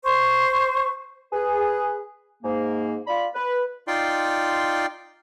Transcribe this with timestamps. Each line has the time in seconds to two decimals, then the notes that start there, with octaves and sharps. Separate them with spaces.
0.04 C5 C#6
1.33 G#4 B4
2.43 G#2 A#3
3.07 F4 D5 B5
3.34 B4
3.88 D#4 F4 D5 G5 C6